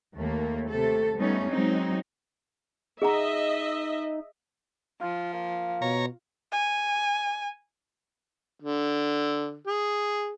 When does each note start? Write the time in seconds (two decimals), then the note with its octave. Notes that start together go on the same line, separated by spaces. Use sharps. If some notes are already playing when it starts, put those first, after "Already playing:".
0.15 D#2 A3 A#3
0.70 C3 A3 A4
1.17 G3 A3 B3 C#4 D#4
1.49 F#3 G#3 C4 D#4
3.02 D#4 G#4 D#5 E5 F#5 A#5
5.01 F3 F4
5.34 A#3
5.82 B2 C#5 A#5
6.52 G#5
8.61 D3
9.67 G#4